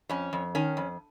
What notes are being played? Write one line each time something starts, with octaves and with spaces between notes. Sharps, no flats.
F2 C#4
F2
D#3 C#4
F2